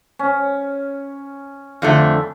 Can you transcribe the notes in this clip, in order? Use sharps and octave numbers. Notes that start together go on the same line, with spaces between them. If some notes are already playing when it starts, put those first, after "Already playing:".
C#4
F2 D3 A3